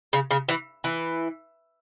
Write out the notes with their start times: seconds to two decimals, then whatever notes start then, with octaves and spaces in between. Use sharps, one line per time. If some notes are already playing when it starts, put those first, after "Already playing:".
0.13 C#3
0.31 C#3
0.49 E3
0.84 E3